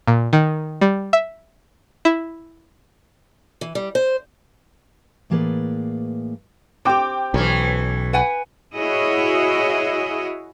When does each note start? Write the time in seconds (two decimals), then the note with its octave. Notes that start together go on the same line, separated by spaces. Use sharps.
0.08 A#2
0.33 D#3
0.81 G3
1.13 E5
2.05 E4
3.61 E3
3.75 G3
3.95 C5
5.30 A2 E3 A#3 G#4 B4 D5
6.85 C4 G4 G5 D6
7.34 B1 E3 C#4
8.13 B4 F#5 G#5
8.75 E4 F#4 G#4 C#5 D#5